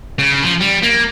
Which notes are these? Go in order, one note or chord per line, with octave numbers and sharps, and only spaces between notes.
C#3
F3
G3
A#3